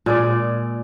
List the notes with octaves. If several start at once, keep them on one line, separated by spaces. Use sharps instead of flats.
A#2 G#3 D5